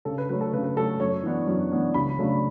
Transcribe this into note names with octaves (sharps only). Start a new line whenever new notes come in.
C#3 A4
B4
F#3 A3 C#4 B4
A4
C#3 B4
B4
F#3 A3 C#4 A4
F#2 C#5
E3 B3 D4
F#2
E3 B3 D4
C#2 B5
C#3 F#3 A3 D4